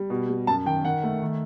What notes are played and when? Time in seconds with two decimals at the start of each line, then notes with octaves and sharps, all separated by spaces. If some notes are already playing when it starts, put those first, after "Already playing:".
Already playing: G3
0.10 B2
0.29 G3
0.47 F#2 A5
0.66 D#3 G5
0.85 D#3 F#5
1.03 A3
1.22 D#3